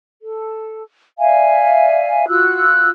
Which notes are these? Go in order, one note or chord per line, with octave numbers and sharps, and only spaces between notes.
A4
D5 E5 F5 G#5
F4 F#4 E6 F#6